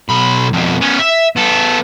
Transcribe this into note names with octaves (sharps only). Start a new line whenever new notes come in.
B1 B5
F2 B2
B3 C#4
E5
B3 A4